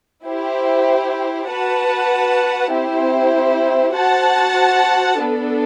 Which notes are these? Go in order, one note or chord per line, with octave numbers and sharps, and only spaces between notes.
E4 G4 C5
F#4 B4 F#5 A5
C4 E4 G4 C5
F#4 C5 F#5 A5
B3 D4 A4